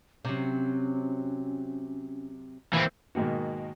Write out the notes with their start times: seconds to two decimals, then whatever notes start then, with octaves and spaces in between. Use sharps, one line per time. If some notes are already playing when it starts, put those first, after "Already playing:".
0.25 C3 F#3 C#4
2.73 E3 A#3 C4 E4
3.15 G#2 B2 D#3 A#3 F#4